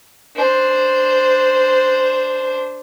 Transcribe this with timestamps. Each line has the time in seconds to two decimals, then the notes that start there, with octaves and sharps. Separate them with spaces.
0.36 D4 C5